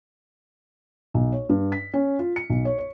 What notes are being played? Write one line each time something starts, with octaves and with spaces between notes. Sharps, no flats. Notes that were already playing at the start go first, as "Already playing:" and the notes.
B1
C#5
G2
B6
C#4
F4
C#7
B1
C#5
C#5